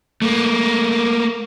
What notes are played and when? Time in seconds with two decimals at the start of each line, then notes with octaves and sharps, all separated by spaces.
0.22 A3 A#3